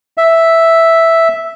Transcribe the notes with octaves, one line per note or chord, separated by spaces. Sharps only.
E5